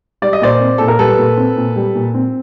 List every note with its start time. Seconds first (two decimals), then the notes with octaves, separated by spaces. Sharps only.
0.22 G3 D5
0.33 D#5
0.41 A#2 C5 D5
0.60 C4
0.78 A#2 A4
0.88 A#4
0.99 G3 A4 B4
1.18 A#2
1.37 C4
1.57 A#2
1.76 G3
1.95 A#2
2.14 C4